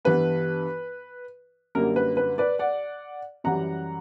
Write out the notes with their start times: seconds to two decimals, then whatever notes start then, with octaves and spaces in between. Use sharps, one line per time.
0.05 G2 E3 B3 B4
1.75 F#2 D3 G3 A#3 A#4
1.96 B4
2.17 B4
2.38 B4 D5
2.59 D5 F#5
3.44 F#2 E3 G3 F#5 A#5